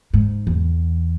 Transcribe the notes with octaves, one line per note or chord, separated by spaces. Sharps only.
G#2
E2